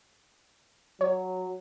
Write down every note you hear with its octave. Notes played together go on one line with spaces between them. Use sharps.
F#3 C#5